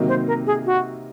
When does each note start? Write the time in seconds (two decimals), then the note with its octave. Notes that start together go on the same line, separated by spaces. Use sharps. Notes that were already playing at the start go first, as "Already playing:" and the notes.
Already playing: C3 D#3 F#3 A#3 D#4
0.08 C5
0.27 A#4
0.47 G#4
0.66 F#4